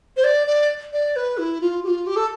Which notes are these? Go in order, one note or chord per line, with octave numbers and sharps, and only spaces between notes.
C5
D5
D5
D5
B4
E4
F4
G4
F4
G4
A4